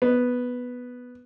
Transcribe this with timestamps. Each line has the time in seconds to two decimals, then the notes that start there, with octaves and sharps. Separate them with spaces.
0.02 B3